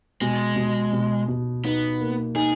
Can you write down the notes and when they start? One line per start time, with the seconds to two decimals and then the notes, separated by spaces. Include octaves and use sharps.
0.21 B2 G#3
0.56 B2
0.93 B2
1.28 B2
1.64 B3 D#4
2.00 A#3
2.35 D#4 G#4